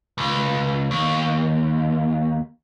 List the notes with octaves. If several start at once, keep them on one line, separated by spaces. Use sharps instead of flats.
C#2
D#2